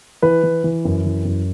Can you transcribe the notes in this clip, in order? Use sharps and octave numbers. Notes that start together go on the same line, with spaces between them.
E3 B4
E3
E3
F#2
E3
F#2